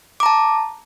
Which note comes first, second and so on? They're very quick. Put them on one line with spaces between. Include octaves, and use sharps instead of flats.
D6 A#5 A5